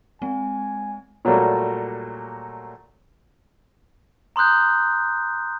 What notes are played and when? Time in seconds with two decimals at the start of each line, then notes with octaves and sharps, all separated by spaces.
0.22 G#3 C4 G#5
1.25 A#2 F#3 G3 A3 A#3
4.36 A#5 C6 D#6 F#6 G6